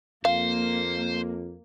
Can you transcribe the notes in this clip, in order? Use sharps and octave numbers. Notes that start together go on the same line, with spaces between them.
F2 A#3 C5 F5